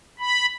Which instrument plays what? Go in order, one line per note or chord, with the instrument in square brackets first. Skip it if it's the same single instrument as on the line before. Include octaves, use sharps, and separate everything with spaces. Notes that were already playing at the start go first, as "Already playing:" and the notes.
[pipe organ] B5